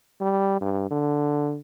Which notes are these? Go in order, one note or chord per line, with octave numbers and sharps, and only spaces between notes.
G3
G2
D3